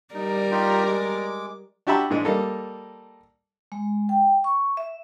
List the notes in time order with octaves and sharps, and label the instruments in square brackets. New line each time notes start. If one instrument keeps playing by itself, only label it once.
[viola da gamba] G3 A#4 D5 [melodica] D#4
[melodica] D#4 F4 G4
G#3 D6
[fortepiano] D4 F#4 G4 E5 A5 B5
G#2 E3 G#3 D4
G3 A#3 D#4 A4
[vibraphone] G#3
G5
C#6
E5